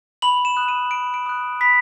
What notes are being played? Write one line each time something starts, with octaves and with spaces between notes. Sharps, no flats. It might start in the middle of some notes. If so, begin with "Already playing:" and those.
B5 F#7
E7
D#6 F#6
D#7
B5 D7
D7
D#6 F#6
B5 B6